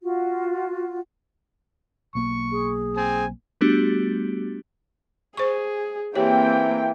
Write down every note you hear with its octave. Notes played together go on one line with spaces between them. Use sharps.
F4 F#4
B1 A#3 C#6
G#4
C4 G#5
G3 A3 B3 D4 F#4 G4
G#4 C5 C#6
E3 A#3 C4 G4 C#5 G5